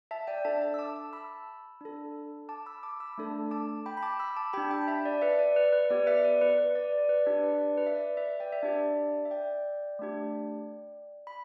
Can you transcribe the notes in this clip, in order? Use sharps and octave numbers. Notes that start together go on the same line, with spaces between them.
E5 A5
D5 G5
D4 A4 E5 A5
E5 A5
E6
A5 D6
A5 D6
B5 E6
D4 A4
A5 D6
B5 E6
A5 D6
B5 E6
A3 D4 A4
A5 D6
G5 B5
B5
A5 D6
B5 E6
A5 D6
D4 G4 G5 B5
G5 B5
B5
E5 A5
D5
B4 E5
D5
B4
B4
B3 G4 D5
B4 E5
D5
B4
B4
D5
D5
B4
D4 G4 D5
B4
D5
B4
E5
D5
B4 E5
D5 G5
E5
D4 G4 D5
E5
D5 G5
A3 D4 G4
B5